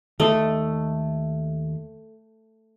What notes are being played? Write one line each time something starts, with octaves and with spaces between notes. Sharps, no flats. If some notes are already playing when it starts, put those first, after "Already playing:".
D#2 A3 D#5 C6